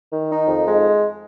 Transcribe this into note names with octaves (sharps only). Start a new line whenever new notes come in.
D#3
D#4
F2
G#3